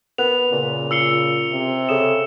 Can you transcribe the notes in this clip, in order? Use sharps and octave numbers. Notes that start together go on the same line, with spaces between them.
B3 A#4 F#5 F#6 F7
A#2 C#3
F4 E6 C7 C#7 G7
C3
C#3 A4 D#6 E7